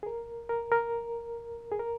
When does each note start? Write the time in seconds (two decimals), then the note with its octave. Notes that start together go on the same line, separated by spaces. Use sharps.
0.03 G#4
0.06 A#4
0.49 A#4
0.72 A#4
1.72 G#4
1.80 A#4